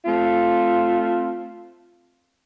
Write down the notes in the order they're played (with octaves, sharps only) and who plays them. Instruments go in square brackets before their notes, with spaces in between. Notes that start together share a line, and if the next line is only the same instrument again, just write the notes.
[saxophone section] A3 C4 F4